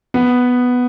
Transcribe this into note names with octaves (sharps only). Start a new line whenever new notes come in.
B3